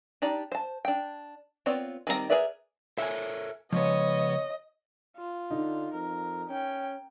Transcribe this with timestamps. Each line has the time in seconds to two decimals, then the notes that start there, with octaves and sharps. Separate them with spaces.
0.22 D4 D#4 G4 D5
0.52 C5 A5
0.85 D4 G5
1.66 B3 C4 F4 C#5 D5
2.07 D#3 G3 C4 E4 A#5
2.30 G#4 A#4 B4 D5 E5
2.98 A4 A#4 C#5 E5 G#5
3.73 C#3 F3 G#3 B3 C#5 D#5
5.17 F4
5.51 D3 D#4
5.94 F2 A#4
6.50 C#4 G5